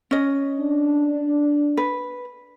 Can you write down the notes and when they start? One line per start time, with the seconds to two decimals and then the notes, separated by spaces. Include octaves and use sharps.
0.11 C#4 D#5
0.60 D4
1.77 B4